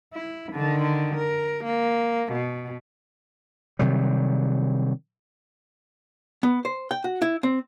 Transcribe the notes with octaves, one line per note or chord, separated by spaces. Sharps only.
E4
D3 D#3
A#4
A#3
B2
C3 D#3 F#3 G3
B3
C5
G5
F#4
E4
C4